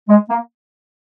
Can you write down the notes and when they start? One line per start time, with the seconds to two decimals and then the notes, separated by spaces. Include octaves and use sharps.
0.09 G#3
0.30 A#3